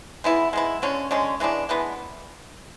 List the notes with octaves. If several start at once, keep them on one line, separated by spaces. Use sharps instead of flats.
G#3 B3 E4
G#3 B3 E4
D3 G#3 C#4
D3 G#3 C#4
E3 G#3 B3 D4
E3 G#3 B3 D4